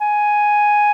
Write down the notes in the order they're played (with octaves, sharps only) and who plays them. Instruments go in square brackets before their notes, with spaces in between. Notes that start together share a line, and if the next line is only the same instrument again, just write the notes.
[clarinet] G#5